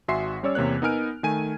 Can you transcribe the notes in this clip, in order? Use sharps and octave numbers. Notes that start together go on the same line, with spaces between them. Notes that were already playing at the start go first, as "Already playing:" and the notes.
G#1 F#4 E5 G#5 C6 C7
G3 C#4 C#5 D5 E6
E2 C3 A#3 C#5 F#6
B3 D#4 A#4 G#5 F6 D7
D#3 A3 G#5 G#6 D#7